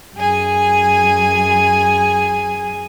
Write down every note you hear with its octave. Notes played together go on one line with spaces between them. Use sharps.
F#2 G#4 G#5